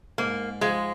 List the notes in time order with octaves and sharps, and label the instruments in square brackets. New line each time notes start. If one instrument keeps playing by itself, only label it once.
[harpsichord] G#2 [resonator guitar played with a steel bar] A#3
[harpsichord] F3 [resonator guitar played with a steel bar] G#3